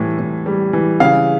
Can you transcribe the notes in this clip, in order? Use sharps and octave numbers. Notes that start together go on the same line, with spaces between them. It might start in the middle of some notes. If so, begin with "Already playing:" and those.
Already playing: A2 E3 G3
A2
G3
E3
C#3 F5